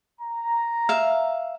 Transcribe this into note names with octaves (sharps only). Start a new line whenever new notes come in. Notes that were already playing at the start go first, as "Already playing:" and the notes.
A#5
E5 F5